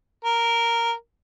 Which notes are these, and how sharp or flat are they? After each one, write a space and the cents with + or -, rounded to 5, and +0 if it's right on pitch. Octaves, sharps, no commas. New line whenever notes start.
A#4 -5